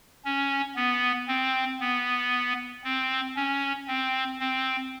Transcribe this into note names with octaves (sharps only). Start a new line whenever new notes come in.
C#4
B3
C4
B3
C4
C#4
C4
C4